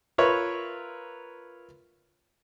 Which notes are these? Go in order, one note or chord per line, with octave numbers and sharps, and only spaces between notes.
F4 A#4 B4 C#5 E5